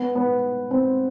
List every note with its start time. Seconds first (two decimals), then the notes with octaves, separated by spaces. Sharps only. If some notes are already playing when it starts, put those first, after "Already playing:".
Already playing: B3
0.15 B3
0.71 C4